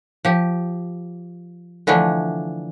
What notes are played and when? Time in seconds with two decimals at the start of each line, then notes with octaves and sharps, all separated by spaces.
0.25 F3 G4
1.87 D3 E3 F3 A3 D4